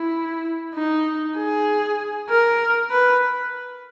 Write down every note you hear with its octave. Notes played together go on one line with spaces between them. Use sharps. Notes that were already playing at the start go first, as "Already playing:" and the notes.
Already playing: E4
D#4
G#4
A#4
B4